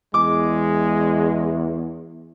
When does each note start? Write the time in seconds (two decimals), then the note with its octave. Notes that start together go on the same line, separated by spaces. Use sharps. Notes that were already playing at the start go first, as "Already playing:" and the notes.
0.14 E2 G#3 D6